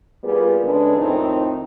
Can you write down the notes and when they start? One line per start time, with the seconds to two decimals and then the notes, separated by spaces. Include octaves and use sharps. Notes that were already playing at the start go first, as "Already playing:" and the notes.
0.24 G3 A#3 B3 F4 G#4
0.63 C#3 G#3 D4 G#4 A4 B4
0.97 F2 A2 D#3 C4 D#4